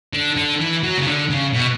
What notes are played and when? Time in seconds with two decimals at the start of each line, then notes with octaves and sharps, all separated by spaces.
0.14 D3
0.37 D3
0.60 E3
0.83 F#3
0.98 C#3
1.06 D3
1.30 C#3
1.54 B2